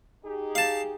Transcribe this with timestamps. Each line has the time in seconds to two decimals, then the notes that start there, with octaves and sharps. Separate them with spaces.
0.24 D#4 G4 G#4
0.55 F5 A5